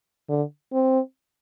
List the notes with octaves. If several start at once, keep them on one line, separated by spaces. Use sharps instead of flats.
D3
C4